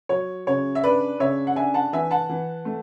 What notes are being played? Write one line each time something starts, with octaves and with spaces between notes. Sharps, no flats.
F#3 C#5
C#3 C#5
E5
D4 B4 D5
C#3 C#5 E5
F#5
D4 E5 G#5
F#5 A5
E3 E5 G#5
F#5 A5
E3
A3